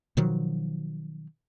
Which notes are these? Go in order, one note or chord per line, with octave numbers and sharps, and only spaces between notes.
B2 D#3 F3 F#3